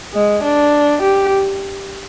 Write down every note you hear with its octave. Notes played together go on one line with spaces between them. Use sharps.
G#3
D4
G4